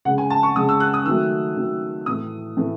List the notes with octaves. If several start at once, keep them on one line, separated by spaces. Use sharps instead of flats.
C#3 G#3 F#5
G#5
A5
C#6
C#3 G#3 D#6
E6
F#6
D#6
D#3 F#3 A3 E6
D#3 F#3 A3
A2 E3 A3 D#6
A2 E3 A3